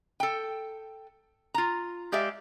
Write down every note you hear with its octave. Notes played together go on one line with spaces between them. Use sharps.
A4 G5
F4 A#5
G#3 G4 D5 E5 F5